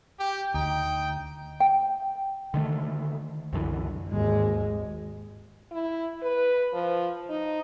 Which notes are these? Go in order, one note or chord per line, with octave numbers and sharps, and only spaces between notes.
G4 G5
D2 D#4 G5
G5
D3 D#3 A3
C2 F#2 D3 E3
G#1 D#2 G#2 G#3
E4
B4
F3
D#4